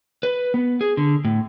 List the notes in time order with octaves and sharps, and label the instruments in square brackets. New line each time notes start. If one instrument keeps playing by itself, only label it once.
[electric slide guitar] B4
B3
G#4
D3
A2